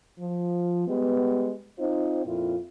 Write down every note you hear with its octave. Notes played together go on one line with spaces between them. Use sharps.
F3
G3 G#3 B3
C4 D#4 F4 C5
F2 A#2 E4 F4